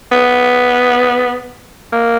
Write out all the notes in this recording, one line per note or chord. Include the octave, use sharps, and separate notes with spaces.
B3
A#3